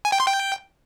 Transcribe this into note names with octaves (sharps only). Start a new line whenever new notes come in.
G#5
G5
C6
G5